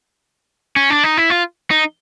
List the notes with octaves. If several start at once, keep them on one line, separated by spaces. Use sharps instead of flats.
C#4
D4
D#4
E4
F4
D#4